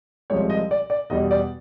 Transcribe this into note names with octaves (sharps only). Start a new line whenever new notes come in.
C2 C3 F3 G#3 C#5
D#5
D5
D5
E2 B2 G3 D#5
D5